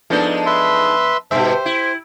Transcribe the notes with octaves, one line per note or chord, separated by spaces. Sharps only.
F3 G#3 B3 D4 D#4 A4
B4 E5 C6
G2 B2 G4 C5 E5
E4